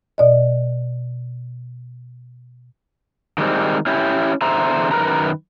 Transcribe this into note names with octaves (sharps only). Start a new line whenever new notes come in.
B2 D5 D#5
D#3 G3 G#3 C4
C#4 E4 G4
E2 D3 C5 E5 A#5
F#2 D#3 A#4 B4 A#5